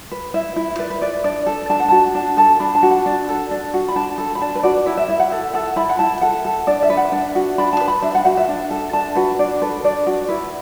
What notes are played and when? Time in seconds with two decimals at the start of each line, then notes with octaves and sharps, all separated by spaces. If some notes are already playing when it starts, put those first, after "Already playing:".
0.12 B4
0.34 E4 E5
0.56 E4
0.79 B4 D5
0.90 B4
1.02 B4 D5
1.24 D4 D5
1.47 A4
1.70 D4 A5
1.80 F#5
1.88 F#4 A5
2.15 D4 A5
2.37 A4 A5
2.60 D4 B5
2.75 A5
2.83 F#4
2.91 F#5
3.06 D4
3.29 A4
3.51 D4
3.74 F#4
3.89 B5
3.96 D4 A5
4.18 A4
4.35 B5
4.41 D4 A5
4.55 B4
4.63 F#4 D5
4.86 E4 B4
4.97 E5
5.08 E4 E5
5.20 F#5
5.31 A4 F#5
5.54 A4 F#5
5.76 E4 B5
5.89 F#5
5.99 E4 A5
6.21 A4 F#5
6.45 A4
6.67 D4 D5
6.83 E5
6.90 B4
6.97 F#5
7.12 D4
7.35 F#4
7.58 D4 B5
7.73 A5
7.80 B4
7.88 B5
8.02 D4 E5
8.15 F#5
8.25 F#4 F#5
8.37 E5
8.49 D4
8.71 A4
8.93 D4 A5
9.15 F#4 B4
9.39 D4 D5
9.62 A4 B4
9.84 D4 D5
10.07 F#4 D5
10.29 E4 B4